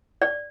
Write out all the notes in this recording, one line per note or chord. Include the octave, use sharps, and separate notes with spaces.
D5